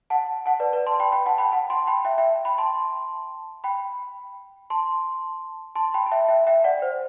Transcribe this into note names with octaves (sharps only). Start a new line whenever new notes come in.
F#5 A5
F#5 A5
B4 D5
B4 D5
A5 C6
G5 B5
G5 B5
F#5 A5
G5 B5
F#5 A5
A5 C6
G5 B5
E5 G5
E5 G5
G5 B5
A5 C6
G5 B5
A5 C6
A5 C6
G5 B5
A5
E5 G5
E5 G5
E5 G5
D5 F#5
C5